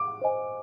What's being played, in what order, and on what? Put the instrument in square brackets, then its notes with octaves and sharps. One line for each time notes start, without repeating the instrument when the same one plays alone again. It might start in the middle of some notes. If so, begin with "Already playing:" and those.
Already playing: [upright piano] D6
[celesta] C5 D#5 G#5